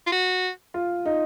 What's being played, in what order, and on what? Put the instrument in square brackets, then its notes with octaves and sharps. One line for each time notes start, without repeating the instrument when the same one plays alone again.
[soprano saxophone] F4
F#4
[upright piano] F4
D#4